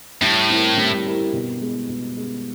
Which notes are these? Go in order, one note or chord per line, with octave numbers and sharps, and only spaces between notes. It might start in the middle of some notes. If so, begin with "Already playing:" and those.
A2 G3
C4 E4 G4 A#4
G3
C4 E4 G4 A#4
B2
G#3 B3
B2
G#3 B3